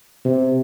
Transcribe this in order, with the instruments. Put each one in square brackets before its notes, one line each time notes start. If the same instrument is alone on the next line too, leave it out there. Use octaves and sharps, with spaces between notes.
[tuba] C3